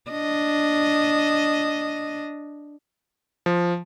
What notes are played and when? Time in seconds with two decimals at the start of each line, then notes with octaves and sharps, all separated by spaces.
0.11 D4 D#5
3.46 F3